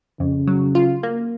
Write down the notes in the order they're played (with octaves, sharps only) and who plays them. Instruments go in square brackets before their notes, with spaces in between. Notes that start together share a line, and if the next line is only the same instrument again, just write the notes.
[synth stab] F2 [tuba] C#3
[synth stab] F#3
F4
A#3